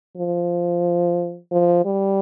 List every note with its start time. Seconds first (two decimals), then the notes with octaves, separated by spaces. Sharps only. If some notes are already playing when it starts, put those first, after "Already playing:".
0.17 F3
1.52 F3
1.85 G3